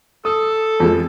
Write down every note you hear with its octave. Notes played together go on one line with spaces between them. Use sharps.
A4 D#6
F2 F3 G#3